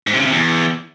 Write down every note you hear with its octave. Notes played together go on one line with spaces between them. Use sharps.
G#2
C3
C#3
C3
E2